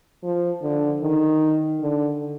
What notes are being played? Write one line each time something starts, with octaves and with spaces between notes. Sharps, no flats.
F3
D3
D#3
D3